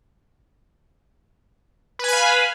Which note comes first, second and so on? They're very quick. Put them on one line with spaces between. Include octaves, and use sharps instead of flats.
B4 G#5 B5 F5